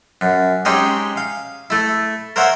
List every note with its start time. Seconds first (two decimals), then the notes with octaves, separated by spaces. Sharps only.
0.21 F#2
0.65 G#3 C4 C#4 D#4 G4 G#4
1.17 F5
1.70 A3 E4
2.36 A#4 C5 C#5 E5 F#5